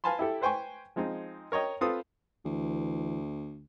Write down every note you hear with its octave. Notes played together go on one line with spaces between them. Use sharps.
B4 F5 G#5 A5 B5 C6
E4 G4 A4
B4 C5 G5 G#5 C#6
F3 G#3 C4 D#4
A#4 C#5 D#5 G5
C4 F4 A4 B4 D#6
D2 E3